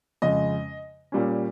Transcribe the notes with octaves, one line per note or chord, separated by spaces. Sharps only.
F2 C#3 G#3 D#5
A#2 G3 C#4